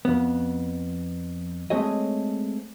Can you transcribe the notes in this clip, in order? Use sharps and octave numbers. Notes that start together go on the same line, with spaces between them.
F2 B3
G#3 A3 C4 G#4 C#5 D#5